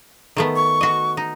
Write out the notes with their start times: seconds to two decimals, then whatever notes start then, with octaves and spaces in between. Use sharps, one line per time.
0.37 D#3 A3 B3
0.55 C#6
0.81 F#4 D#5
1.17 D#4